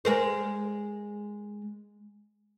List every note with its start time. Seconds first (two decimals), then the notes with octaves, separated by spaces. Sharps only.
0.05 G#3 A#4 C5